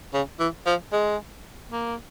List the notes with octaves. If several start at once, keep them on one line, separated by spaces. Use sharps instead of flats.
C#3
E3
F3
G#3
A#3